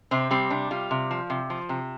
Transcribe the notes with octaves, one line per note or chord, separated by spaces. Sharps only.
C3 C4
G3 C4
C3 D4
G3 F4
C3
F3
C3
F3
C3